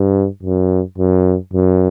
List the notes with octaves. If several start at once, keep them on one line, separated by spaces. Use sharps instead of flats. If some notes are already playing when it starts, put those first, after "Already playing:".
Already playing: G2
F#2
F#2
F#2